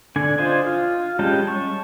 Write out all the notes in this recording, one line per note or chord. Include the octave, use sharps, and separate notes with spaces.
D3 D4 G#5
D4 F4 C5 D#5 G#5
F4
G3 G#3 C#4 G5 A5
A5 C#6